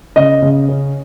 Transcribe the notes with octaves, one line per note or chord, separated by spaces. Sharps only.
C#3 D#5
C#3
C#4